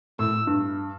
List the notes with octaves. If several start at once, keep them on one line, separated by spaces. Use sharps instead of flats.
A2 E6
G2